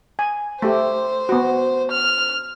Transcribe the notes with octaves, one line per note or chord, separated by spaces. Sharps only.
G#5
A3 G4 C5
B3 F#4
F6